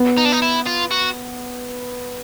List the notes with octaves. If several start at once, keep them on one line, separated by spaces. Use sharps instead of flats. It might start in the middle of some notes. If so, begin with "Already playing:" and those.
Already playing: B3
D#4
D4
D#4
E4
F4
F#4